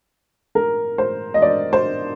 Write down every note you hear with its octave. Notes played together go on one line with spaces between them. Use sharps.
A#4
C5
D#5
D5
C5